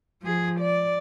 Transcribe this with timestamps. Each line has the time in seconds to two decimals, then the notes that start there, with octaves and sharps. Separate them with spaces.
0.22 F3 G#4
0.60 D5